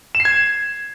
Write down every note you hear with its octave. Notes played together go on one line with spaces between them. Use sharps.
E7
C7
G#6